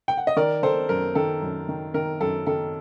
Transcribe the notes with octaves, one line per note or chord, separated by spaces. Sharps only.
G5
F#5
D#5
D#3 A#4 D5
D#3 A4 C5
F#2 A#4
D#3 A4
F#2
D#3
D#3 A#4
F#2 A4
D#3 A4